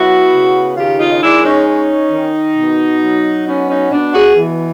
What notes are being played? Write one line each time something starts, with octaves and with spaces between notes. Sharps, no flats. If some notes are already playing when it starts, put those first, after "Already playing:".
Already playing: F#3 B3 E4 F#4
C#3
D#3 F4 G4
D#4 F4
D#4
G#3 D4 E4
C#4 D#4
C#4
D#3
B2
F#3
B3 C#4 D#4
C#4 D#4
B2 D4
F#4 G#4
E3